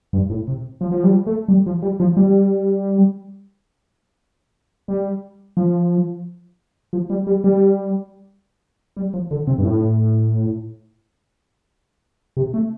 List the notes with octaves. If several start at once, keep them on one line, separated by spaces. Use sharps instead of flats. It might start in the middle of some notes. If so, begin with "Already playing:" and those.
G2
A2
C3
F3
F3
G3
A3
G3
F3
G3
F3
G3
G3
F3
F3
G3
G3
G3
G3
F3
D3
C3
G2
A2
C3
A3